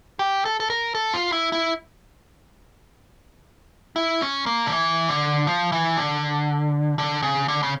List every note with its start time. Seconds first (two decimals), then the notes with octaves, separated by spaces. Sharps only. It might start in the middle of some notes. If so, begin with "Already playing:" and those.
0.19 G4
0.45 A4
0.60 A4
0.70 A#4
0.95 A4
1.13 F4
1.32 E4
1.52 E4
3.96 E4
4.22 C#4
4.46 A#3
4.66 D3
4.72 E3
5.09 D3
5.47 F3
5.72 E3
5.97 D3
6.98 D3
7.22 C#3
7.48 D3
7.63 C#3